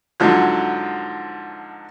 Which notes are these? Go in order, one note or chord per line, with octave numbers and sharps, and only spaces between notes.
G#2 D3 F3 F#3